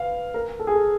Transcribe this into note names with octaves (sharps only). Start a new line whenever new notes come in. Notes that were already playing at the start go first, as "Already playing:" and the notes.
Already playing: B4 F5
A#4
A4
G#4
A4